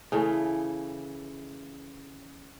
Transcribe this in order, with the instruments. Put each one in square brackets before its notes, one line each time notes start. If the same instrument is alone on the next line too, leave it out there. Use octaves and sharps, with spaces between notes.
[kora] C#3 E3 A3